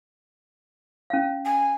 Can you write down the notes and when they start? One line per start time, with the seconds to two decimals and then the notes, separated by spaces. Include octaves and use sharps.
1.10 C#4 F5
1.45 G#5